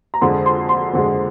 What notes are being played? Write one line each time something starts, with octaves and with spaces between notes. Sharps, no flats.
A#5
F2 D3 G#3 C6
C6
C6
F2 D3 G#3